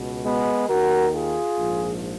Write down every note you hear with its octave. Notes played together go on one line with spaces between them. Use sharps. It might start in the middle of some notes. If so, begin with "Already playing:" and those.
Already playing: C#2 B2
G#3 B3
D#2 D#3 F#4 A#4
F4 G#4
A#1 G#2 F3